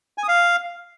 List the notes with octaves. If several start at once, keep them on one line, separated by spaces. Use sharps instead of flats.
G#5
D#6
F5